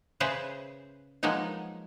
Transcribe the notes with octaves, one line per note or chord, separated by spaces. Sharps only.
C#3 G#4 B4 C5 E5
F3 F#3 G#3 A#3 B3 D#4